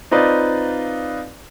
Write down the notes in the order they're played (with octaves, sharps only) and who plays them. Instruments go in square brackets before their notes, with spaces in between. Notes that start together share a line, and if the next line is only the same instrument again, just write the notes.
[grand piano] C4 D#4 F4 B4 D5 D#5